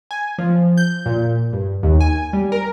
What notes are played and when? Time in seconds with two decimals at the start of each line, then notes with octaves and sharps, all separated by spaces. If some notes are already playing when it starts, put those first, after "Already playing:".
0.11 G#5
0.38 F3
0.77 G6
1.06 A#2
1.53 G2
1.83 D#2
2.01 G#5
2.33 G3
2.52 A#4